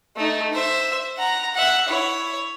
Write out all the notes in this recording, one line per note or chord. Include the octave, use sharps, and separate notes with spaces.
A3 D#4
C5 E5
F#5 A#5
E5 F#5
E4 C#5